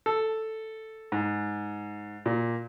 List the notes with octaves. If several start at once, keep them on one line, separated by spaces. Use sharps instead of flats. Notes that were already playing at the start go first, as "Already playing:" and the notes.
A4
G#2
A#2